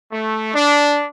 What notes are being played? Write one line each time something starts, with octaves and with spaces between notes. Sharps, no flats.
A3
D4